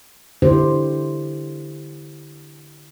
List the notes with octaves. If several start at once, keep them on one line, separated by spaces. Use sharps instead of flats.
D3 E4 G4 C5